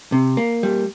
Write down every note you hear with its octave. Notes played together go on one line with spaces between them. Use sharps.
C3
A#3
G3